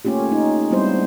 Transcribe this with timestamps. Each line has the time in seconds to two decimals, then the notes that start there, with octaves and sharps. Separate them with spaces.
0.05 A3 A#3 C#4 F4 G4
0.32 D#4
0.71 G3 G#3 B3 C4 E4 C5